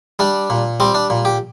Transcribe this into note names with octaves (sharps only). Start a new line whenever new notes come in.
G3 D4
A#2
G3 C4
D4
A#2
G4